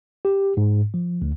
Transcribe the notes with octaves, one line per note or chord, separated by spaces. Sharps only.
G4
G#2
F3
D2